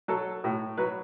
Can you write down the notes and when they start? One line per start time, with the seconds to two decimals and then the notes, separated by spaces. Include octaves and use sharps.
0.08 F#3 A4
0.44 A2
0.78 F#3 B4